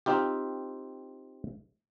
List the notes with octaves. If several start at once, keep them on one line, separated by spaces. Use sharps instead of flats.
C4 D#4 F4 G4